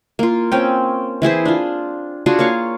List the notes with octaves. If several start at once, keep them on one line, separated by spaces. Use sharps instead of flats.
A#3 F4
C4 C#4 G5
E3 E4 G#4 C5
D4 F4
D4 F4 F#4 G#4
A#3 C#5 F5 C#6